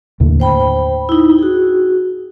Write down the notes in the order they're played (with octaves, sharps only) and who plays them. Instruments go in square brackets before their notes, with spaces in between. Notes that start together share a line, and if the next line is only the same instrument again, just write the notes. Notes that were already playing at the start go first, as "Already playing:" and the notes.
[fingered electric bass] D#2 A2 D3
[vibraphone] C5 G5 B5
D#4 E4
F#4 G#4